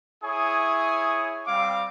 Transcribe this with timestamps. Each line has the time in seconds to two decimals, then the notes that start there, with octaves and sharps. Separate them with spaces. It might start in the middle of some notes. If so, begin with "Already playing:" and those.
0.24 E4 G#4 C#5 G#5 D#6
1.46 G3 C4 F5 D6